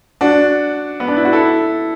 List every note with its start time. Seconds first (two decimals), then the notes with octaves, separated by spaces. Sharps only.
0.21 D4 F#4
1.00 B3
1.08 D4
1.16 E4
1.25 F#4
1.33 E4 A4